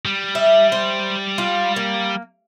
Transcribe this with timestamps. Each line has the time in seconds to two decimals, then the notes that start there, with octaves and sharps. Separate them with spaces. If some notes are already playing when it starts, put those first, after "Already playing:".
0.05 G3
0.35 E5
0.72 C5
1.38 F4
1.76 A#3